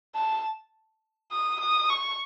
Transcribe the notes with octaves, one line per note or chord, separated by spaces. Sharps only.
A5
D#6
D#6
C#6